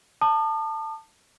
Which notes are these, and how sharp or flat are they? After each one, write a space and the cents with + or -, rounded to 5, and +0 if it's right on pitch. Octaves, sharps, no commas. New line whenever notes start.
A5 +15 D#6 -45